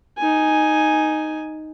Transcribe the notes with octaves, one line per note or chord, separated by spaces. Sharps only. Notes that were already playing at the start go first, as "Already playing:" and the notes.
D#4 G#5